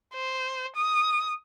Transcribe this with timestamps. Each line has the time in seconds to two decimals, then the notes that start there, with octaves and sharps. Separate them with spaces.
0.14 C5
0.76 D#6